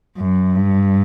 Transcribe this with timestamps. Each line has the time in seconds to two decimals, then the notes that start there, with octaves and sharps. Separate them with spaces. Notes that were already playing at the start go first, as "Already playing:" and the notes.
0.18 F#2
0.55 G2